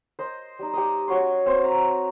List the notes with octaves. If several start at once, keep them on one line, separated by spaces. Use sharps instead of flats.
C5 D#5
G3 D#4
G4 C5 D#5
C#4 F#4 C#5 C6
C4 C#5
A#5